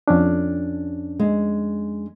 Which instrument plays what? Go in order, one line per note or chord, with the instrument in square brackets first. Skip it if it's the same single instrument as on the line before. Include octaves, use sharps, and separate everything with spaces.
[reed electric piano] F2 C#4 D4
[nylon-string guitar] G#3